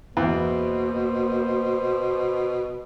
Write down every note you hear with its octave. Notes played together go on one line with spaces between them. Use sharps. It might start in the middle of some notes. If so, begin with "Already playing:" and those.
E2 B2 A#3 C5